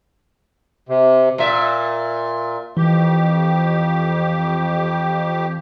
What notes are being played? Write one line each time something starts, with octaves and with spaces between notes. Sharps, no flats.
C3
A#2 E5
F2 E3 G4